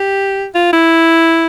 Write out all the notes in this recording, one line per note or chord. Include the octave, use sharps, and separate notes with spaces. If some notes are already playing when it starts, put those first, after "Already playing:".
Already playing: G4
F4
E4